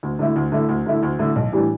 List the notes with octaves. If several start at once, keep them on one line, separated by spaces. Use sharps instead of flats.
D2
D3 A3 E4
D2
D3 A3 E4
D2
D3 A3 E4
D2
D3 A3 E4
B1
A2 E3 G3 D4